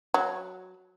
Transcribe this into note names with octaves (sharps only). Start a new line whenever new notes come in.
F#3